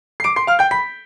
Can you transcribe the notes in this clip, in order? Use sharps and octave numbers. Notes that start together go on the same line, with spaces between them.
C7
D6 D7
C6 C7
F5 F6
G5 G6
B5 B6